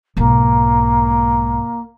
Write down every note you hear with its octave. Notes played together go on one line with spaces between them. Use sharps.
B1 G#2 A#3